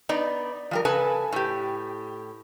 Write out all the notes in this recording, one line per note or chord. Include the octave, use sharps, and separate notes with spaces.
B3 D#4 D5
F3 G3 A#4
C#3 A4 B4 G#5 A5
A2 G4